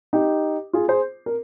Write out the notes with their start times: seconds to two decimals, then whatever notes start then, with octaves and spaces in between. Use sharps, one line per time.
0.13 D#4 G4
0.73 F4 G#4
0.88 G#4 C5
1.26 A#4